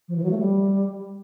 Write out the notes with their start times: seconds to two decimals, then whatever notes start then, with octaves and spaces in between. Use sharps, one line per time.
0.08 F3
0.15 E3
0.23 F#3
0.30 A3
0.38 G3